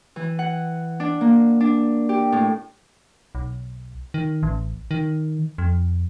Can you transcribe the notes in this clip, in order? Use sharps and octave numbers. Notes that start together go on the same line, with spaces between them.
E3
F#5
D4
A#3
D4
G4
A2
B1
D#3
A1
D#3
F2